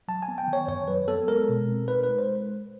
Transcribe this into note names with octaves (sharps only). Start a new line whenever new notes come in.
F#3 A5
G#5
B3
G5
D#3
C#5
F#2 C#5
F#3 B4
B3 A4
G#3 A#4
B2
C4
D#4 B4
B4
G#3
C5